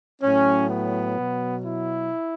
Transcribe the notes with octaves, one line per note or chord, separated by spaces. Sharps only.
A2 F#3 C#4
B3
B2 F#3
E4